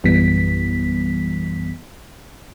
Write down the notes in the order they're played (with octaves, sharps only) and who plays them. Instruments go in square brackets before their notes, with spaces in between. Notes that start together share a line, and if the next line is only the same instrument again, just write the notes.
[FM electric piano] A#1 F#2 E3 G3 B3 B6